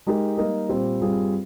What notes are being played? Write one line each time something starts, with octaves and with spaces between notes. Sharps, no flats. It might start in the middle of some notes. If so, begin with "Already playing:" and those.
G#3 D#4 G4 A#4
G3 A#3 D#4 A#4 D#5
A#2 G3 C4 G4 C5
G2 G3 C4 F4 G#4